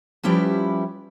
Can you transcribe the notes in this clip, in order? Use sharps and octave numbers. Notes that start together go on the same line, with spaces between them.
F3 G3 C#4 E4 G4 B4